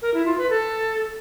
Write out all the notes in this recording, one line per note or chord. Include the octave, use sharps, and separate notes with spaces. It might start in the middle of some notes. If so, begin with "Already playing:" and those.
A#4
E4
F4
B4
A4